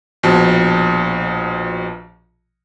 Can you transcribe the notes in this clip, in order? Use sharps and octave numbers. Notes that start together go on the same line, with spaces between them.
A#1 B2 F3 A5